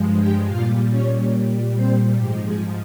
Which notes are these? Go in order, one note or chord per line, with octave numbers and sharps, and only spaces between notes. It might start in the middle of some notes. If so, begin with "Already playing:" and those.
Already playing: G2 F3 G#3
G4 G5
A#2 G3 F4 F5
C#4 C#5
C4 C5
G#2 F3 G#3 G4
G#3 G#4